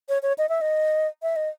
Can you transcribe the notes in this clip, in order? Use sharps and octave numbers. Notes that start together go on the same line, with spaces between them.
C#5
C#5
D#5
E5
D#5
E5
D#5